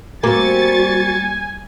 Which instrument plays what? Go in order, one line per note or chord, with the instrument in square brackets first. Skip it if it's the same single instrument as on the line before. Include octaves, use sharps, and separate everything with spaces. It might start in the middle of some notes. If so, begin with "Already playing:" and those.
[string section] G3 A6 C#7 [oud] A#3 C4 [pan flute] F#4 [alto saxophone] G#5